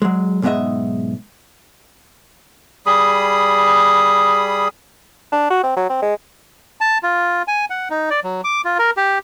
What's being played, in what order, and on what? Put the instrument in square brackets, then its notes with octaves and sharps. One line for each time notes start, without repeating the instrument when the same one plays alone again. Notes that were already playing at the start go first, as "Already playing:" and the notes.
[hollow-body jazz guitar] F#3 G#3
B1 G#2 G#3 B3 D#5 E5
[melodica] G3 G#4 B5 D#6
[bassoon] D4
F#4
C4
F#3
C4
G#3
[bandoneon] A5
F4
G#5
F#5
D#4
D5
F#3
D6
F4
A#4
G4